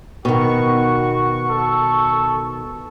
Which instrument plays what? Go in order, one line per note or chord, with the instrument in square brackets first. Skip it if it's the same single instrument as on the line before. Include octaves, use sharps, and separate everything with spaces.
[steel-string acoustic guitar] B2 D#3 [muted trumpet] F#4 [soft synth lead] C#6
[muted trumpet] A4